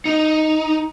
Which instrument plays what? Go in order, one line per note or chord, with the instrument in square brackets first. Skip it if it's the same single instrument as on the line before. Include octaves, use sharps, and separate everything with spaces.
[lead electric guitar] D#4